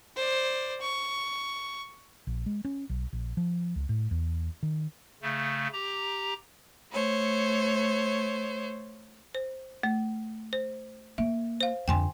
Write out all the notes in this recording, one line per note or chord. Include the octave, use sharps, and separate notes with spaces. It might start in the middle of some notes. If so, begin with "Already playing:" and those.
C5 D5
C#6
A#1
G#3
C#4
B1
A#1
F3
C#2
A2
E2
D#3
C#3 A3
G4 A#5
A3 C5 C#5
C5
A3
C5
A#3 E5
C5 F5
F2 D3 G5 G#5 C6